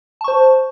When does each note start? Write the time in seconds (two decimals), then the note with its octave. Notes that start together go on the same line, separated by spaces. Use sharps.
0.21 A5
0.24 C#6
0.28 C5